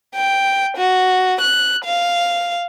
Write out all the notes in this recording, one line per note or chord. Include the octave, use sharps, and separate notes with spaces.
G5
F#4
F#6
F5